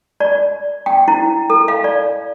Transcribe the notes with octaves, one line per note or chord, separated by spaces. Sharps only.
D5
G5
E4
A4
F5
D5